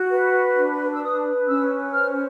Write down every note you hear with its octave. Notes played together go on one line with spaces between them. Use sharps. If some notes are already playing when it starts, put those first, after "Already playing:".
Already playing: F#4
B4
D4
E6
B4 D#6
C#4 E6
C5 F6